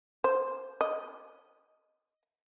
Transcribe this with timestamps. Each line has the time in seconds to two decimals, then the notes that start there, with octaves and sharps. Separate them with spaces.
0.24 C5
0.81 D#5